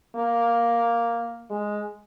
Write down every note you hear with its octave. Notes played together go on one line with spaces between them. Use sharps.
A#3
G#3